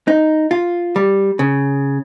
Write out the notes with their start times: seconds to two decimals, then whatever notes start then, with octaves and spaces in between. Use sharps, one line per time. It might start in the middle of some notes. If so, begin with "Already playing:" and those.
0.08 D#4
0.51 F4
0.96 G3
1.39 C#3